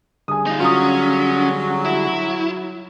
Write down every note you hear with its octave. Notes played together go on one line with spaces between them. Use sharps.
D3 G3 G#4 G#5 D#6
D#4 F4
F#3 C#4 F4 D#6
E4